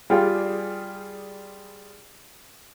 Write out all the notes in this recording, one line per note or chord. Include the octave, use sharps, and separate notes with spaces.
G3 F4 G#4 D5 G5